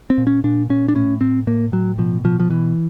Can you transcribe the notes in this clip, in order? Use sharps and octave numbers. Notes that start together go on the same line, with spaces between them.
C4
A#2
C#4
A#2 D4
A#2 C#4
D4
A2 C#4
A2 C4
A2 A#3
A2 F#3
B2 F3
B2 F3
F3
B2 E3